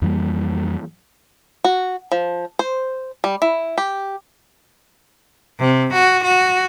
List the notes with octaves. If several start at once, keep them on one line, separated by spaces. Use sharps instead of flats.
F2 E3 G3 A#3
F#4
F3
C5
G3
E4
G4
C3
F#4
F#4